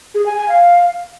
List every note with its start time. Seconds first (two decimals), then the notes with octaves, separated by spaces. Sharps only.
0.15 G#4
0.26 G#5
0.37 G#5
0.49 F5